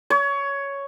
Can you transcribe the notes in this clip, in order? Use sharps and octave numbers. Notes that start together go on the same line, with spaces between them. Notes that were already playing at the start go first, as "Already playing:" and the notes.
C#5